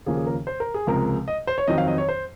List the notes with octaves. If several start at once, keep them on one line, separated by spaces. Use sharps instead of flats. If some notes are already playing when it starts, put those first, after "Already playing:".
D#2 C#3 F3 A#3 C#4 G#4
G#4
A#4
C5
A#4
G#4
C#2 C3 F3 G#3 A#4
D#5
C5
C#5
F2 D#3 F#3 C4 D#5
F5
D#5
C#5
C5